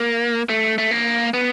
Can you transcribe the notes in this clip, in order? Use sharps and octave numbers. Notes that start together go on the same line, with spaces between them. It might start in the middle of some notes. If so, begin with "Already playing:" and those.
Already playing: A#3
A3
A3
A#3
B3